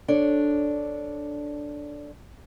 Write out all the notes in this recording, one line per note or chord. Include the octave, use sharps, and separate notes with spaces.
D4 A4 C#5